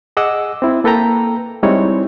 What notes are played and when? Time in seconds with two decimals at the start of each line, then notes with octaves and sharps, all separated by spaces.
0.17 G#4 D#5 F#5 D6 E6
0.62 C4 E4
0.84 A#3 A4 B4 G5 A#5
1.63 G3 G#3 C4 D#4 E4 C#5